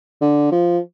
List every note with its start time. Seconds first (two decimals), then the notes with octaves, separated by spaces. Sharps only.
0.21 D3
0.52 F3